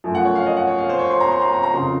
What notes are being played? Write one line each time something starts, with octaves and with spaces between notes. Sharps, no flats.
F#2 F3 A3
F#5
C#5
F5
D#5
F#5
C#5
F5
C5
C#5
C6
A#5
C6
A#5
A#5
A#5
F#1 F2 C#3 C6